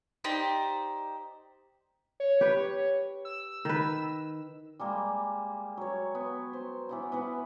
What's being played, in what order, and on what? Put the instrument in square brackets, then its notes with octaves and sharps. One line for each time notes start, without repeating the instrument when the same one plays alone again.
[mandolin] D#4 G4 C5 D5
[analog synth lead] C#5
[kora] G4 B4
[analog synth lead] E6
[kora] D#3 B4
[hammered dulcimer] G3 G#3 A#3
F#3 C#5
B3
C5
E3 B3 F#5
E3 B3 B4